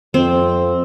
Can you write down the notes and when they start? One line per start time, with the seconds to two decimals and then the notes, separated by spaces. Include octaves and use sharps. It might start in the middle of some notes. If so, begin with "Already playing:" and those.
0.14 F2 C4